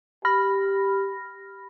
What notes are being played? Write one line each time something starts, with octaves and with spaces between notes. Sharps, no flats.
G4 B5 F6 A#6